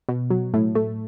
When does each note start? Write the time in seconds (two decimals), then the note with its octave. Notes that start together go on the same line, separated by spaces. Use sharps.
0.09 B2
0.30 F#3
0.54 A2
0.75 A3